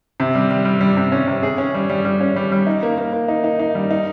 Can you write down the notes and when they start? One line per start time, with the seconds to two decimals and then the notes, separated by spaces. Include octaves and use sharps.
0.20 C3
0.35 G3
0.51 G3
0.65 G3
0.81 G3
0.97 C3
1.12 C#4
1.28 C3
1.43 G#4
1.58 C#4
1.74 G3
1.90 G3
2.05 G3
2.21 C#4
2.36 G3
2.52 G3
2.67 D#4
2.83 A#3
2.98 A#3
3.13 A#3
3.28 D#4
3.44 D#4
3.60 D#4
3.75 G3
3.91 D#4